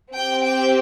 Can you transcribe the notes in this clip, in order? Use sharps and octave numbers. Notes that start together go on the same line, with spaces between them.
C4 G4 G5
G5